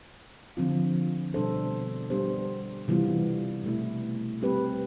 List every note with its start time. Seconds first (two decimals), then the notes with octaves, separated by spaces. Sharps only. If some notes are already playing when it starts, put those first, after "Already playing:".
0.57 D3 F3 C4 F4
1.34 B2 G3 D4 A4 C5
2.10 G3 B3 D4 G4 C5
2.88 C3 E3 G3 B3 F4
3.64 B2 A3 E4
4.41 G3 C4 G4 B4